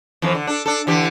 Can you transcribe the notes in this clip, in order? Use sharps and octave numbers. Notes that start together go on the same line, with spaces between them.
F2 E3 F3
D3
D4 A4
D4 A4
D3 E3 G4